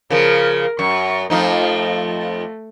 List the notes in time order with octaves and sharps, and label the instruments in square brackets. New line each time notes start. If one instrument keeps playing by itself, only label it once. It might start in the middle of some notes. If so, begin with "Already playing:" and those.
[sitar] C#3 F3 [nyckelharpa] A#4
[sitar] F#2 [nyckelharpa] C#6
[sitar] F2 F3 D#4 [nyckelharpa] A3